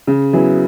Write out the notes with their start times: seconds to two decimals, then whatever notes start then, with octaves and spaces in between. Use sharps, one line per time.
0.07 C#3
0.33 F#3 B3 E4 G#4